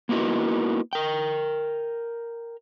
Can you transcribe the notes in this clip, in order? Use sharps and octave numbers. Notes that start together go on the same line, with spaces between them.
A#3 B3 D#4 E4 F#4 A#4
A#4 G5